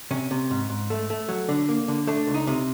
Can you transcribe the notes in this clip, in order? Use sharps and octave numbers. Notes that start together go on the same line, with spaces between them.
C3 C#4
C3
G#2
G#2
A3
A3
F#3
D3
A#3
D3
A3 D4
C#2
D#4
C3